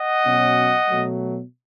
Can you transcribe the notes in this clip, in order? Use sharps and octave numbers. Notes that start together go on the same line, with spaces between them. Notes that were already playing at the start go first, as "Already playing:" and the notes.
Already playing: D#5 F#5
B2 F#3 C#4
B2 F#3 A3